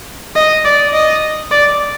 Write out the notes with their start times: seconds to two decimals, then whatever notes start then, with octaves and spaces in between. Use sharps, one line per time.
0.36 D#5
0.65 D5
0.94 D#5
1.51 D5